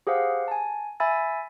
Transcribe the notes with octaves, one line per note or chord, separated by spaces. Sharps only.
G4 G#4 C5 F5 F#5
G#5 A5
E5 G#5 B5 E6 A6